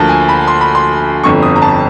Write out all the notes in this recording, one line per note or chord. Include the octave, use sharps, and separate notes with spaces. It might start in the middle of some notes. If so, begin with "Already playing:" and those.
Already playing: D2 D3 F3 A#3 A5
G#5
B5
C6
B5
C6
G1 F2 D3 C#6
D#6
A#5
A5